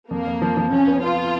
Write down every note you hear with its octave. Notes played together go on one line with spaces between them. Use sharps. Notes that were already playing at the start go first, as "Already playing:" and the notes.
F2 A#3
F2
F3
F3
F2 C#4
B3
B3 F4